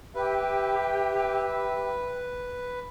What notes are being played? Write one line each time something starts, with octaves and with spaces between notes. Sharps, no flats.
G4 B4 E5 G5